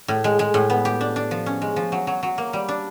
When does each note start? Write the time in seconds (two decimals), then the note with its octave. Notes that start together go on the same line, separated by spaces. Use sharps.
0.08 A2
0.24 G#3
0.39 G#3
0.54 A2
0.70 B3
0.85 G4
1.01 D4
1.16 D4
1.31 F3
1.46 C#4
1.62 G#3
1.76 F3
1.92 F#3
2.07 F#3
2.23 F#3
2.38 A#3
2.53 G3
2.69 D4